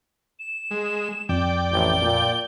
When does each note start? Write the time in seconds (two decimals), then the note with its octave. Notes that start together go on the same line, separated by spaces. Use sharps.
0.39 E7
0.71 G#3
1.29 F2 D5 G5
1.72 A1 G7
2.02 A#2